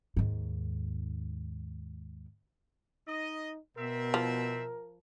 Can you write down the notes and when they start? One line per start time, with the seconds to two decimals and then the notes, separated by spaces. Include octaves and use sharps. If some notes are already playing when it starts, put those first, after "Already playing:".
0.17 D#2 G#2
3.08 D#4 D#5
3.77 B2 C4 A#4 E5
4.14 F3